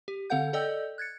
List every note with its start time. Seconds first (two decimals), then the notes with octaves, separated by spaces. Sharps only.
0.08 G4
0.30 D3 C4 A4 F5 F#5 G6
0.53 A4 D5 D#5 G5 E6 G6
0.98 F#6 G#6 A6 C#7